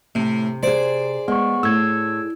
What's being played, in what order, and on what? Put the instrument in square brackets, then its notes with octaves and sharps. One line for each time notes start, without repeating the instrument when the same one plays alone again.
[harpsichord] A2 [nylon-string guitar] C3
[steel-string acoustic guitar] G#4 C5 [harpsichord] D5 D6
[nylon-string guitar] G#3 [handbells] B3 C#6
[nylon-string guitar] A2 [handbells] E6 G#6